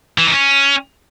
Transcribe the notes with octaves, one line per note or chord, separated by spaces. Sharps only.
E3
D#4
C#4